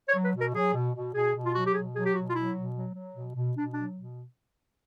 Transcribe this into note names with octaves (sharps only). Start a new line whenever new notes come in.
C#5
F#3
B4
B2 A#4
F#3 G#4
B2
B2
B2 G#4
B2
F4
F#3 F#4
G4
B2 G#4
F#3 G#4
G4
B2 F#4
F4
F#3 E4
B2
F#3
F#3
B2
B2
B2 D4
F#3 D4
B2